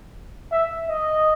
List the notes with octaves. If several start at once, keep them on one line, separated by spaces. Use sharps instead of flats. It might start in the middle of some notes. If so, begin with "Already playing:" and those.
E5
D#5